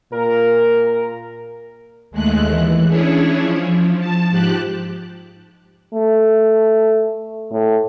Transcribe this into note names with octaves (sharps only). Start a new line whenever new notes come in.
A#2 A#4
D#2 G#3 A3 F#6
E3
C#4 D4 E4 G#4 C#5
F3
A5
G#2 F3 G4 F#6
A3
A2